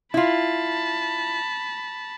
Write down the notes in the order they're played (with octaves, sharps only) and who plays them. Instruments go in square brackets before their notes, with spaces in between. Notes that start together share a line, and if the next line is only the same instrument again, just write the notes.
[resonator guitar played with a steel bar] E4 F4 [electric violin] A5 B5